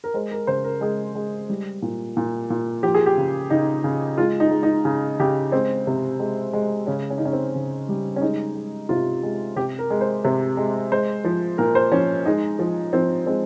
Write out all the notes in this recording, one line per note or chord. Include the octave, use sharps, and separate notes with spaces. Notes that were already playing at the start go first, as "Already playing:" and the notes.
A#4
G#3 C5
A#4
C#3 C5
A#4
G#3 G#4
G#3
G3
A#2
A#2
A#2
F3 G4
G#4
G4
C#3
C#3 D#4
C#3
G#3 F4
D#4
G#3
D#4
C#3
C#3 G4
G#3 C4
C3
G#3
G#3
C#3 C#4
C#4
D#4
C#3 C#4
C4
C#3
G3
C#4
G#3 D#4
G#3
C3 F4
G#3
C3 G4
A#4
G#3
C5
C3
G#3
G#3 C5
F3
A#2 A#4
C5
F3 C#4
G#3 D#4
F3
F3 C4
G#3 C4